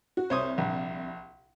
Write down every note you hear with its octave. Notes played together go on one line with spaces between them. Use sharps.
F#4
C2 C5 C#5 D#6
A#1